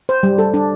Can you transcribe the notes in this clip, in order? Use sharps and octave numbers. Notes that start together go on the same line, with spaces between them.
C5
G3
A4
D4